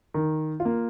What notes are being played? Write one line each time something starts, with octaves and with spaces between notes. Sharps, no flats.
D#3
F4
A#3